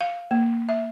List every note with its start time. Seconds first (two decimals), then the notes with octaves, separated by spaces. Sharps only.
0.01 F5
0.31 A#3
0.69 E5